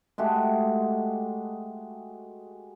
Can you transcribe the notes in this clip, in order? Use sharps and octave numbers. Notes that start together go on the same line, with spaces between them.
G#3 A3 F#4 G4